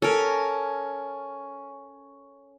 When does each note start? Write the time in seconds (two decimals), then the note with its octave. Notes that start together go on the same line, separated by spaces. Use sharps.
0.02 C#4 A4 A#4